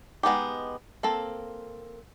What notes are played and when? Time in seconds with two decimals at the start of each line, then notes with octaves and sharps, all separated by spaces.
0.23 G#3 B3 D#4 G4
1.03 A#3 C4 A4